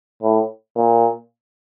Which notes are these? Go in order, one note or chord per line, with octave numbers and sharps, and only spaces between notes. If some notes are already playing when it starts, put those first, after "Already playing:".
A2
A#2